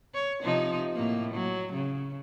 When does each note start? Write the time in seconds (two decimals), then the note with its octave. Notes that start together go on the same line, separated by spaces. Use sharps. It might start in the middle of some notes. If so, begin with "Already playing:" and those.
0.14 C#5
0.42 C3 F3 D#4
0.94 A2 A#3
1.33 F#3
1.72 C#3